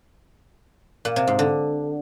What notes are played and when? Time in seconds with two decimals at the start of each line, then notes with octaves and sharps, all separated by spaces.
1.05 A#2
1.16 C3
1.27 G#2
1.39 D3